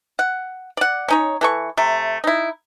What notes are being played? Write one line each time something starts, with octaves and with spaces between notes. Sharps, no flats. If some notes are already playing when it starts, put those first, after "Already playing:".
F#5
D5 F#5
C#4 D#4 C#5
E3 A4 C#6
C3 A3
D#4 E4